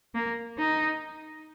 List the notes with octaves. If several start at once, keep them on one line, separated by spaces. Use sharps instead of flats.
A#3
D#4